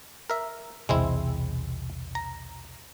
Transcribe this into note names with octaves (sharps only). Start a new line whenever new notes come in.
A#4 E5
B1 E2 C3 G#3 C4 E4
A#5